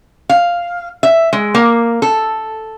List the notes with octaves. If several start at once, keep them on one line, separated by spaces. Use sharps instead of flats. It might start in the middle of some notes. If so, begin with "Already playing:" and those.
F5
E5
G#3
A#3
A4